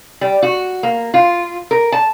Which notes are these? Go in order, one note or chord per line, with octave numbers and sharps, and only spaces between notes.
G3
F#4
A#3
F4
A#4
A5